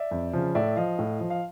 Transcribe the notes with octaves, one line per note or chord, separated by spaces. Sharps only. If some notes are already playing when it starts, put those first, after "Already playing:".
Already playing: D5 E5
F2
C#3 F3
A2 D5 E5
F3 D#5 F5
A2
F3
F5